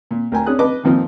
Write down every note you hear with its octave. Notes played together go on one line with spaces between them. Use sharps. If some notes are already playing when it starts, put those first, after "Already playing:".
A#2
D2 A#4 G5 G#5 A#5
C#4 D4 G#4 D#6 F#6
B4 D#5 A5 D6
F2 A#2 D#3 F3 C4